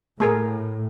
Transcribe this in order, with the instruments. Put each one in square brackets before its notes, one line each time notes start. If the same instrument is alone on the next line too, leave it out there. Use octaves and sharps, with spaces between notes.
[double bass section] A2 [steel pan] A3 G#4 A#4